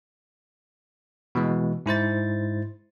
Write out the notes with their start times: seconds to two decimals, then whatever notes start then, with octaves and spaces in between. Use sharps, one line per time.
1.35 B2 E3 G#3
1.86 G#2 E4 C5 A6